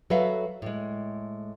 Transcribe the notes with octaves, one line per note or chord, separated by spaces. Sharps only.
F#3 F#4 A4 B4 E5 F5
A2 G#3